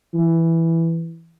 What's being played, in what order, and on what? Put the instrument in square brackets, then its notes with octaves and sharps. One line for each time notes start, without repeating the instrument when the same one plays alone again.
[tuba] E3